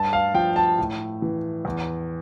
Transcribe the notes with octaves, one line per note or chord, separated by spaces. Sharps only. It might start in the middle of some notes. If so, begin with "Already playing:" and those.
Already playing: G2 A5
F5
F3 G5
A5
A2
E3
E2